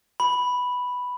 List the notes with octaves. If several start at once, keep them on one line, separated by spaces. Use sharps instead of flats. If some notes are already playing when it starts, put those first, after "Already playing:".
B5